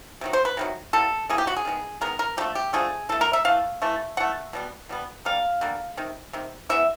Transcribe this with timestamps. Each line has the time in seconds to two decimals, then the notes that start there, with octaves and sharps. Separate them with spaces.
0.21 C3 D#3 F#3
0.33 C5
0.45 B4
0.57 C3 D#3 F#3
0.93 E3 G3 A#3 A4
1.29 E3 G3 A#3 G#4
1.38 G4
1.47 F#4
1.56 G#4
1.65 D#3 G#3 B3
2.01 D#3 G#3 B3 A#4
2.19 A#4
2.37 D3 F3 A3 G4
2.55 G4
2.73 D3 F3 A3 G#4
3.09 E3 A3 A4
3.21 A#4
3.33 E5
3.45 E3 A3 F5
3.82 E3 A3
4.17 E3 A3 F#5
4.53 B2 G3 B3
4.89 B2 G3 B3
5.25 D3 G3 A#3 F5
5.61 D3 G3 A#3
5.97 C3 D#3
6.33 C3 D#3
6.69 E3 G#3 B3 E5